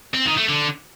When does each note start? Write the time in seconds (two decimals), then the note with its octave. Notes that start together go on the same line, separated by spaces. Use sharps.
0.14 C4
0.26 D#3
0.37 A3
0.49 D3